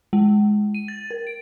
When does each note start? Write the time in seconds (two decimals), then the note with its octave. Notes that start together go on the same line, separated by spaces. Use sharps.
0.13 G#3
0.74 D#7
0.88 A6
1.11 A#4
1.27 D7